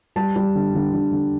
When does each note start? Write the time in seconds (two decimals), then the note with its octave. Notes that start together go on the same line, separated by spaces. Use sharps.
0.16 G3 A5
0.36 G3
0.55 D3
0.75 D3
0.93 D3
1.12 D3